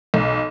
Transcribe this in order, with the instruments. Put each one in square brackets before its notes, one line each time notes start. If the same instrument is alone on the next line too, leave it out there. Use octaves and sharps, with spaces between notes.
[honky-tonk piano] B1